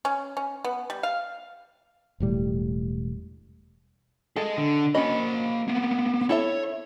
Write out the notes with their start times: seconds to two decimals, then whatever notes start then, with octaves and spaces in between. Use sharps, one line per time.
0.05 C#4
0.37 C#4
0.64 B3
0.90 G3
1.03 F5
2.20 E1 A2 G3
4.36 G#4 A4 D#5
4.58 D3
4.95 A#3 C#4 F#4 D#5 B5
5.68 A#3 B3
6.29 E4 A4 C#5 E5